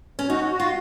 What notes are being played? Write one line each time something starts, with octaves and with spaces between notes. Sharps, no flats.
C#4
D#4 F#4
F#4
F4